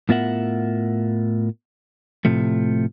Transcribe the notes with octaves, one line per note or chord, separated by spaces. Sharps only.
A2 B3 F4 A#4 E5 F#5
A2 C3 F3 A3